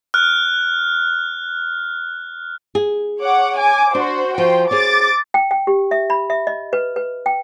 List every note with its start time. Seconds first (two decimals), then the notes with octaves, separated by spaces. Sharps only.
0.14 F6 F#6
2.75 G#4
3.20 C#5 F#5 D6
3.59 G#5 D6
3.95 D4 F#4 C5
4.38 F3 G5 C6
4.71 G#4 C5 C#5 D6 A6
5.34 G5
5.51 G5
5.67 G4
5.91 E5
6.10 B5
6.30 E5
6.47 D#5
6.73 B4
6.96 B4
7.26 G5